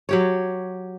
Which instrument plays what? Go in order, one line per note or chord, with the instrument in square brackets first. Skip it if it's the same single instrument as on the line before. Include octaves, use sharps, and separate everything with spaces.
[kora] F#3 G4 C#5